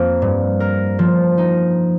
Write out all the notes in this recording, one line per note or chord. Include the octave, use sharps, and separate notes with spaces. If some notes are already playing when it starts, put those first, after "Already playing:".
Already playing: F2 F3 A#3
G2
A#4
F3
D#4